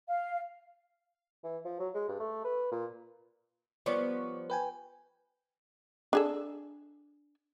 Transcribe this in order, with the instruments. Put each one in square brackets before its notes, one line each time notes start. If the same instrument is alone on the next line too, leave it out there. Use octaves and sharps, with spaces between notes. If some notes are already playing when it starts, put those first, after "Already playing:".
[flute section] F5
[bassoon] E3
F3
F#3
G#3
G2
A3
B4
A#2
[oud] F3 G3 B3 [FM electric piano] C#5 D5 C#6
[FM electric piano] B4 G5 G#5
[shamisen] D4 G#4 A4